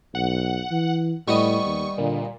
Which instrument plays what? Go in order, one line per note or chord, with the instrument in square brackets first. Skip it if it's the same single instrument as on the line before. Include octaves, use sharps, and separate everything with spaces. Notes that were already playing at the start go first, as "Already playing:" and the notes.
[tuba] B1 [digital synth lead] F#5
[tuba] E3
[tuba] A2 [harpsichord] G3 B3 D#5 [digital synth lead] C#6
[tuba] D#2
[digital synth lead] A#2 [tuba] D3